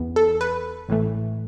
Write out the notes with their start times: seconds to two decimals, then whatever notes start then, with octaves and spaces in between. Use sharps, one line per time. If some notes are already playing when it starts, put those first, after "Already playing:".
Already playing: E2 E3 B3
0.16 A4
0.41 B4
0.89 A1 A2 E3 A3